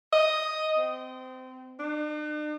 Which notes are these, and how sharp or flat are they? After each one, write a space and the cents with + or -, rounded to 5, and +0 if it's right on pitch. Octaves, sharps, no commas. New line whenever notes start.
D#5 +5
C4 -25
D4 +45